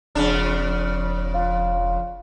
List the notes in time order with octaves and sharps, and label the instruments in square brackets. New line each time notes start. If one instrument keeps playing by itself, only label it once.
[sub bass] E1 [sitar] F2 C#3 D4
[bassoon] F4